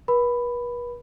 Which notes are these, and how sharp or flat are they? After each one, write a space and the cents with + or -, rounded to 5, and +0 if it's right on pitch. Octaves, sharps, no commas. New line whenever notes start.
B4 -40 B5 +10